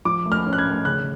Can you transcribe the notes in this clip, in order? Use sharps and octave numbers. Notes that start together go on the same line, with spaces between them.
F3 D6
A3
F6
C#4
F#6
G#6
A3
C#3 F#6